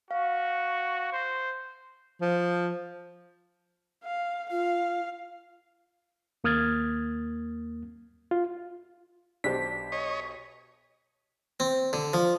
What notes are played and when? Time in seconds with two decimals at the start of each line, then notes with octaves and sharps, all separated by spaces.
0.11 F#4 F5
1.12 C5
2.21 F3
4.04 F5
4.51 F4 F5
6.44 D#2 A#3 D#6 F6 G#6 A6
8.31 F4
9.44 B1 D4 G4 C5 B6
9.92 C#5 D#5
11.60 C4
11.93 D3
12.14 F3